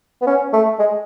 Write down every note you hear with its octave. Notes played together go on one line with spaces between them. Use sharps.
B3
C#4
A3
G#3